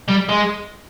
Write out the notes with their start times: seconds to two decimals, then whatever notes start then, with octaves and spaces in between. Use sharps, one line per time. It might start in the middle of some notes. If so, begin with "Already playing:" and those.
0.08 G3
0.29 G#3